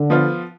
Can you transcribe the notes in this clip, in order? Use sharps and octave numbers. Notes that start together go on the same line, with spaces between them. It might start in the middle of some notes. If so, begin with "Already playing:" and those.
Already playing: D3
F3 B3 F4